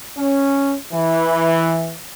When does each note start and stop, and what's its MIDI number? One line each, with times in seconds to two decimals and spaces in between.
0.16 0.75 61
0.92 1.95 52